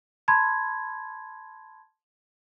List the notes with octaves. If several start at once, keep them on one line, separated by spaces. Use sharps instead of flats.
A5 B5 C6 G#6